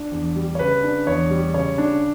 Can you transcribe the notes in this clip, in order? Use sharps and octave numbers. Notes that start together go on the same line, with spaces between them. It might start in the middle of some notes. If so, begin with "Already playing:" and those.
Already playing: D4
E2
G3
C#5
C#3 B4
D4
E2 C#5
G3
C#3 C#5
D4